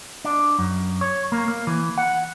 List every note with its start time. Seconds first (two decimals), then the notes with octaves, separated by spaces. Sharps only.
0.25 D4
0.59 F#2
1.01 C#5
1.32 A#3
1.48 A#3
1.67 E3
1.98 F#5